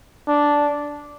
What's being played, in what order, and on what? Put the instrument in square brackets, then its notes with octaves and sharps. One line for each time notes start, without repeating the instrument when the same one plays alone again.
[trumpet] D4